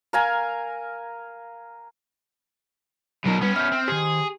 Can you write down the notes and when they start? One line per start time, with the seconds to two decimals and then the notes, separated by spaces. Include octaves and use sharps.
0.13 A#4 F5 G#5 A#5
3.26 B2 F#3 D#4 A#4
3.42 G3 B3 C#4 B4
3.56 E5 F6 G6
3.72 C4
3.88 D#3 G4 G#4 C5